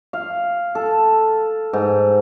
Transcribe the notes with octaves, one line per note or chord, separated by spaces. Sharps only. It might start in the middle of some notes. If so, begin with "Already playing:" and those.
F5
A4
G#2